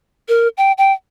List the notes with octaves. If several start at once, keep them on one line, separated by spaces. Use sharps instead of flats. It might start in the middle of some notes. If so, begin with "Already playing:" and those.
A#4
G5
G5